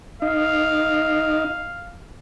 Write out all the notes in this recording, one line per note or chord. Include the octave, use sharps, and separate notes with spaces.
D#4 F5